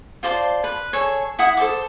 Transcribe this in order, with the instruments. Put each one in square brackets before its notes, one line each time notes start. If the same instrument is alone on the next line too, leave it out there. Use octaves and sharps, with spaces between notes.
[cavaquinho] F4 C5 D5 A5
B4
G#4 A4 C#5
E4 F#5 D#6
A4 C5 A5 D6